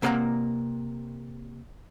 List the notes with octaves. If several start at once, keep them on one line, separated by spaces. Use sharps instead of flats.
C3 A#3 A4 D#5 F#5 A#5